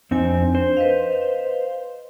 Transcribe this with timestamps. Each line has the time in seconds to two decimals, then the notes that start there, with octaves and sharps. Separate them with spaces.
0.11 F2 C4 D4 D#4 G#5
0.55 C5
0.77 B4 D#5 F5